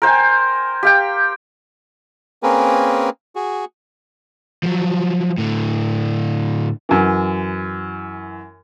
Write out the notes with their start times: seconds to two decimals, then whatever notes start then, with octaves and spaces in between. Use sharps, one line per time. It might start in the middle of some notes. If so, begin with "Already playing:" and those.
0.02 A#4 C5 G5 G#5
0.83 G4 F5 G5
2.43 A#3 C4 C#4 G#4 A#4 B4
3.36 F#4 G#4
4.63 F3 F#3
5.38 A2 D3
6.89 F#2 E3